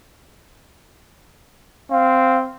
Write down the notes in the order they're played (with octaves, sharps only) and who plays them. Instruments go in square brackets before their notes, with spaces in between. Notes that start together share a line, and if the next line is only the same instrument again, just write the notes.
[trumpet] C4 [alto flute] F5